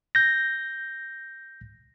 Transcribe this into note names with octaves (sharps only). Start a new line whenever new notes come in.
G6 A#6